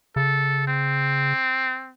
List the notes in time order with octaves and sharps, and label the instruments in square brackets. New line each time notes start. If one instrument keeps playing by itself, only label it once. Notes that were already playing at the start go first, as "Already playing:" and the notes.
[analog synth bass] C#3 [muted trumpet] A4
[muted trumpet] C4